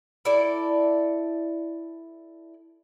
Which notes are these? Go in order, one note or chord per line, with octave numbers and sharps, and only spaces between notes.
E4 A4 D5